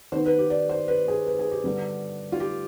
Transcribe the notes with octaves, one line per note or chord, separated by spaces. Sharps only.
D#3 B3 C5
B4
G4
D5
C5
B4
G#4
B4
G#4
G4
D3 G3 B3
F4
G4